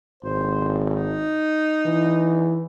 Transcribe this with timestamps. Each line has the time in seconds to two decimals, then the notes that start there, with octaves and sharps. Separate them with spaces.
0.23 G#1 C5
0.92 D#4
1.86 E3